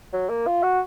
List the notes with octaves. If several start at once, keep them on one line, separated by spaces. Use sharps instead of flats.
F#3
A#3
F4
F#4